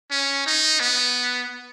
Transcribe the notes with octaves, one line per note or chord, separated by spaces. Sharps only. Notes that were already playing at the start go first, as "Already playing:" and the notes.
C#4
D#4
B3